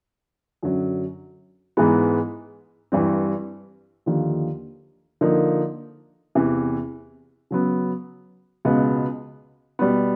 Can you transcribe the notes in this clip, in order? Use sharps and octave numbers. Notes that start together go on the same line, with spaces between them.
F#2 D3 F#3
G#2 E3 G#3 B3
G2 E3 G3 C4
D#2 D3 F3
D3 F3 A#3 D#4
E2 C3 E3
C#3 F#3 B3
C#2 B2 G#3 B3
B2 G3 B3